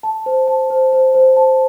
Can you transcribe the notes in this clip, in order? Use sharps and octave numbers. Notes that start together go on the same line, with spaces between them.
A5
C5
A5
C5
C5
C5
A5